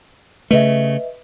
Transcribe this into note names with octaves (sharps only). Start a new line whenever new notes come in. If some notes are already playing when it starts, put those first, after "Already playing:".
C#3 A3 B4 D#5 E5